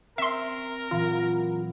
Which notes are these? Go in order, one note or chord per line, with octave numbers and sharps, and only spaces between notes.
C4 A#4 E5 C6
A#2 E3 F#3 F4